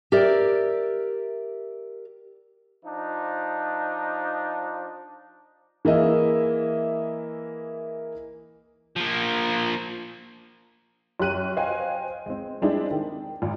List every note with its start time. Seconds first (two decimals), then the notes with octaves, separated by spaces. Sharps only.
0.12 G4 A#4 D5 E5
2.85 F3 D4 D#4
5.85 E3 A#3 G#4 D#5 E5
8.96 F3 A#3
11.20 F#2 G4 F#6 D#7
11.57 C5 D#5 F5 G5 G#5
12.26 G#3 C4
12.62 G3 G#3 C4 D4 E4 G#4
12.91 D#3
13.42 G#1